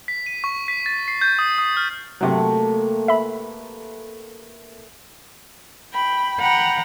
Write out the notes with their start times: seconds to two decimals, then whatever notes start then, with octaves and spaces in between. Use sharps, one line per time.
0.08 B6
0.26 D#7
0.44 C#6
0.68 B6
0.86 A6
1.08 C7
1.21 G6
1.39 D#6
1.58 D#6
1.77 F6
2.21 C3 F#3 A3 A#3
3.08 B4 E5 B5
5.93 G5 B5
6.40 F#5 G5 A#5 B5